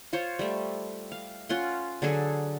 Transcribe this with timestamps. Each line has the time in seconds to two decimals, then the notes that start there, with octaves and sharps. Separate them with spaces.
0.13 F4 C5 C#5
0.39 G3 A3
1.12 F5
1.49 C#4 F4 F#5 C6
2.02 D3 F#3 G#4 A4